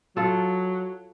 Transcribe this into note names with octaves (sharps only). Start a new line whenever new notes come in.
F#3 F4 A4